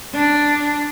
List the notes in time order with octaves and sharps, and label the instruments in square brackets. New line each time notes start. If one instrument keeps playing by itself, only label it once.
[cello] D4